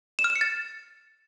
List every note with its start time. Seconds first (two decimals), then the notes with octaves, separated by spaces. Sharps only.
0.19 E7
0.24 F6
0.30 E7
0.36 C#7
0.41 A6